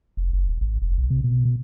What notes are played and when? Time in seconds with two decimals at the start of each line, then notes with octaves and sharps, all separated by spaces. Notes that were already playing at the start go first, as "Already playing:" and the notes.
0.17 F1
0.33 F#1
0.49 E1
0.61 G#1
0.82 F1
0.98 B1
1.10 C3
1.24 B2
1.45 B2